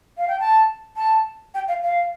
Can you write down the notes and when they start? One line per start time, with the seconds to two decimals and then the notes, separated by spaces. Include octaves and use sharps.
0.18 F5
0.28 G5
0.40 A5
0.97 A5
1.54 G5
1.68 F5
1.83 F5